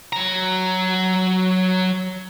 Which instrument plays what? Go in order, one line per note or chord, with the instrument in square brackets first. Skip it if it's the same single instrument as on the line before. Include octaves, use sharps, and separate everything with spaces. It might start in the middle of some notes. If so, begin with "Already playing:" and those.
[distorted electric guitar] F#3 A#5